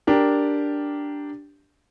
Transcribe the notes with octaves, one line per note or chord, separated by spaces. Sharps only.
D4 G4 A#4